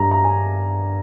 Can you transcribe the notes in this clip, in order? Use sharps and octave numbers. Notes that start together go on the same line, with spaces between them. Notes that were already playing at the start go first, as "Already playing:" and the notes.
Already playing: G2 G3 A#5
A#5
G#5